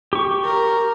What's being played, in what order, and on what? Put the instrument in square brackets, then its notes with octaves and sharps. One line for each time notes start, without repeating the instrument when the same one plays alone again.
[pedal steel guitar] G4 C#6
[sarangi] A#4